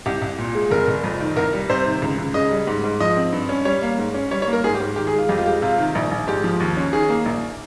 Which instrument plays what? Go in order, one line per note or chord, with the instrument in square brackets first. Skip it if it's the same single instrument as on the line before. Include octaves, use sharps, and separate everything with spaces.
[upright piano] C2 G4
C2
A#2
G#3
F1 A#4
F1
F2
D#3
C2 A#4
G3
C3 C5
D#3
C#2
C#2
C#3 D#5
G3
G#2
G#2
F3 D#5
C4
G2
C#4
G3 C#5
A#3
G#2
C#4
G3 C#5
C#5
A#3
A#4
G#2 G#4
G4
G#2
D#3 G4
G#4
G#3
F4
F2 G4
F4
G#3 G4
C3 F4
D#3
A#1
A#1
G#2 G4
F3
D#2
C#4
D#3 G#4
A#3
A#1